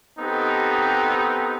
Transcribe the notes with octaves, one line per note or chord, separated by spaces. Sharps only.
B3 C4 D#4 G4 A4